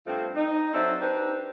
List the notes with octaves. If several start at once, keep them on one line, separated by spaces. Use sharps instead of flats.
G2 F3 A3 C4
D#4
F#3 C4 D4 A4 C5 E5
D4 D#4 G4 B4 C5